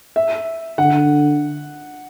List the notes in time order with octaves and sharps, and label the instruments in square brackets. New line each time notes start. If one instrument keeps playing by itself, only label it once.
[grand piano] E5
[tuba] D3 [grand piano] F#5